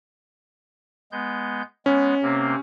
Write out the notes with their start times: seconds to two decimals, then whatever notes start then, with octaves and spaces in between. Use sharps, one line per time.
1.12 G#3 B3 G6
1.86 G#3 B3 C#4
2.23 C3 A#3 C4